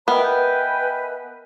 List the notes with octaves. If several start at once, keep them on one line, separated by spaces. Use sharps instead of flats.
B3 A#4 B4 C#5 D#5 E5 G5 A#5
B4 G5 G#5